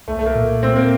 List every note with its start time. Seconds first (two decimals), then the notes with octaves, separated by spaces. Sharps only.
0.08 C2 A3
0.19 A3
0.26 A#3
0.35 A#2
0.63 A3 C4
0.76 A#3